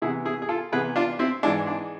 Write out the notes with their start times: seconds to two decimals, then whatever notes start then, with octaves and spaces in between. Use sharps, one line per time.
0.02 C3 E3 B3 E4 G#4
0.25 E4 G#4
0.42 G#4
0.49 F4 A4
0.72 C3 E3 B3 G#4 B4
0.96 D4 F4
1.19 C4 E4
1.43 G#2 E3 G#3 D4
1.67 D4